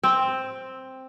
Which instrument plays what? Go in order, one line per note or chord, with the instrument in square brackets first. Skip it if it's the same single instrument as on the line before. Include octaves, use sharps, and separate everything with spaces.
[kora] C4